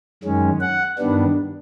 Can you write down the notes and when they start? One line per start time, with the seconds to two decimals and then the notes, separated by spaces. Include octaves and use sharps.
0.24 F#2 D#3 G#3 C#4
0.61 F#5
0.98 G2 D#3 G3 B3 D4